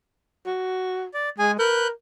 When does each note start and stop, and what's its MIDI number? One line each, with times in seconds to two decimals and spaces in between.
0.47 1.06 66
1.14 1.29 74
1.39 1.58 56
1.39 1.51 68
1.39 1.51 80
1.59 1.90 70
1.59 1.88 71
1.59 1.88 90
1.59 1.88 91